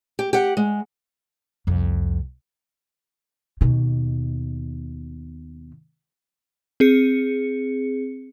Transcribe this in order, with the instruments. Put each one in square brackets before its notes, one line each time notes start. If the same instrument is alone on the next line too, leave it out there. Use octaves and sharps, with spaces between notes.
[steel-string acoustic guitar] G4
G4 F#5
G#3
[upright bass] C2 F2
D#2 B2
[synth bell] C4 G#4 C#7